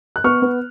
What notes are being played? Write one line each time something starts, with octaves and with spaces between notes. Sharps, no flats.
F#6
B3 C#6 F6
B3